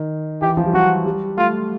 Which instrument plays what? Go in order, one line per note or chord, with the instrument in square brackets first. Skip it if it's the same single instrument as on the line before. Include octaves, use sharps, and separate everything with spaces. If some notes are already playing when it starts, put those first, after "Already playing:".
Already playing: [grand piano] D#3
[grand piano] E3 [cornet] G4
[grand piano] F3
G3
[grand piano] F#3 [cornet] F#4
[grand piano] G3
[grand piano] A3 [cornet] F4